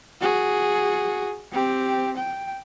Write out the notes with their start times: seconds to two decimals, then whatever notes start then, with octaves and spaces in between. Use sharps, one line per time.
0.21 F#4 G#4
1.52 C4 G4
2.17 G5